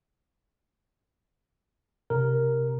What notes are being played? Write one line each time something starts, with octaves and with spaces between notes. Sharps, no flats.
C3 A#4